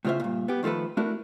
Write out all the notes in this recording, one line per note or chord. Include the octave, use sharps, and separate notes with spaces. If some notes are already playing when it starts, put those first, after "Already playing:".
A2 C#3 F4 C5 E5
G2 A#2
B3 G4
D#3 F3 A3 A4 B4
A3 D4 E4 F#4 A#4